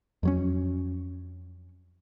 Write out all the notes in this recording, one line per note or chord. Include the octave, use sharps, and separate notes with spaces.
F2 F#3 C#4